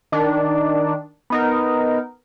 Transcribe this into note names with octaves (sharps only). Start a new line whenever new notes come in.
D#3 D4
B3 D#4 A#4